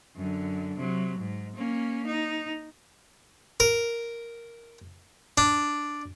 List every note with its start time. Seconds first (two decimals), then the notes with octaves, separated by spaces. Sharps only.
0.16 F#2 D3
0.78 C3 F#3
1.19 G#2
1.56 A#3 C#4
2.06 D#4
3.60 A#4
5.38 D4